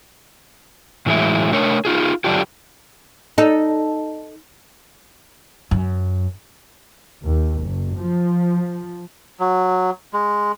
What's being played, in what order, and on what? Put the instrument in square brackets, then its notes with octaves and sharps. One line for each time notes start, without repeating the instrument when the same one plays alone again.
[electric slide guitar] A2 E3 F#3 G#3 E4
A3 D4 A#4 C#5
D#4 F4 G#4
D3 F#3 D4 F4 G4
[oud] D#4 A4
[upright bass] F#2
[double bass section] D#2
F#1
F3
[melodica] F#3
G#3